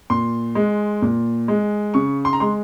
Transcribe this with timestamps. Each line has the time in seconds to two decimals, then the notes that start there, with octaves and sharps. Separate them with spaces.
0.10 A#2 C6
0.55 G#3
1.02 A#2
1.48 G#3
1.94 C#3 C#6
2.25 C6
2.33 A#5
2.40 G#3 C6